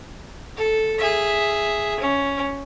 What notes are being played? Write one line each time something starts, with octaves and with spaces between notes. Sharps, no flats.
A4
G#4 E5
C#4